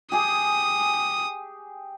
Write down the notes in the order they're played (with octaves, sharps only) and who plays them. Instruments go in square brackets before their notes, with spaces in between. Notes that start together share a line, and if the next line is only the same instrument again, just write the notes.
[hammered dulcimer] G4 G#4 [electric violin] D#6